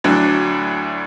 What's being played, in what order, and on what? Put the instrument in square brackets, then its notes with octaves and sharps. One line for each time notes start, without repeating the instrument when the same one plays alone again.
[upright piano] D2 A2 F#3 D4